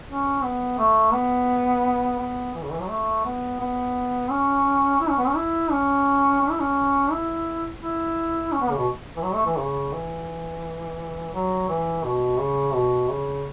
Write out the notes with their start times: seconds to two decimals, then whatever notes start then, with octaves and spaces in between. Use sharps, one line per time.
0.08 C#4
0.43 B3
0.78 A3
1.14 B3
2.19 B3
2.54 E3
2.63 C#3
2.72 E3
2.81 F#3
2.89 A3
3.25 B3
3.60 B3
4.31 C#4
5.00 E4
5.09 C#4
5.18 B3
5.27 C#4
5.36 E4
5.71 C#4
6.41 C#4
6.50 E4
6.60 C#4
7.11 E4
7.82 E4
8.52 C#4
8.61 B3
8.70 C#3
8.78 B2
9.16 E3
9.23 F#3
9.34 A3
9.46 E3
9.58 C#3
9.93 E3
11.34 F#3
11.69 E3
12.04 B2
12.39 C#3
12.74 B2
13.09 C#3